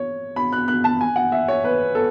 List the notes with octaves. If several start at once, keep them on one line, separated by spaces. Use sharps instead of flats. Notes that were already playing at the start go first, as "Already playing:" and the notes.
Already playing: C#5
B5
F#6
F#6
A5
G#5
F#5
E5
C#5
B4
A4